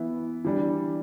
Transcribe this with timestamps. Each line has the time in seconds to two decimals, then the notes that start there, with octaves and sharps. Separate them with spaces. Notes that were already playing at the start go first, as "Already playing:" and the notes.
Already playing: E3 B3 E4
0.45 E3 G3 D4